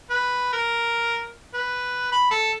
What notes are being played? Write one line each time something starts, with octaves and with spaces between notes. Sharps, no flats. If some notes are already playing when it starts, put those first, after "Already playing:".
B4
A#4
B4
B5
A4